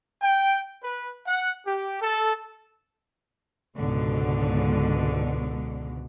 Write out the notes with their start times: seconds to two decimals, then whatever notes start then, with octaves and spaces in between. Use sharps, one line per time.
0.22 G5
0.83 B4
1.27 F#5
1.66 G4
2.01 A4
3.77 C#2 G#2 B2 D3